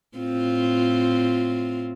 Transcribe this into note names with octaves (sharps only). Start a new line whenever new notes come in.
A2 C4 F4